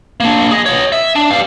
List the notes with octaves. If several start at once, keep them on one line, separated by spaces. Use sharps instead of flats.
A#3 D4
G#4 D#5
C#5 D#5
E5
D4
G3 F5